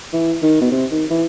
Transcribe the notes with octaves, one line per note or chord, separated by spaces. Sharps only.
E3
D#3
B2
C3
D#3
E3